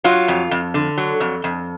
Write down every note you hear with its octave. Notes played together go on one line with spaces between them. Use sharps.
F#3 F4
F2
F2
D3
F#3
F2
F2